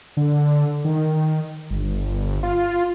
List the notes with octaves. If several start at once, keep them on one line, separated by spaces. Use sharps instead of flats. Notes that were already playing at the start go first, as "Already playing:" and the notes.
D3
D#3
G1
F4